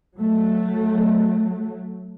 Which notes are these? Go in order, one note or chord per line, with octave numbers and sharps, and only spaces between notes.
F#3 A3